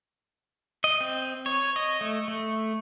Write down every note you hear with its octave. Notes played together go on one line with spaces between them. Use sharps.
D#5
C4
C#5
D#5
A3
A3